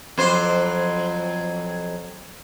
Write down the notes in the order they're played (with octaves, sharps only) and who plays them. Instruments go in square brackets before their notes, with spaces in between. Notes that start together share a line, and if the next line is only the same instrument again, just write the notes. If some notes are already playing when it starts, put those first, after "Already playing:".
[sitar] F2 F#3 C5